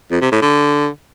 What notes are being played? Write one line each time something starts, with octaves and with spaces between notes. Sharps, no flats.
F2
C3
A2
D3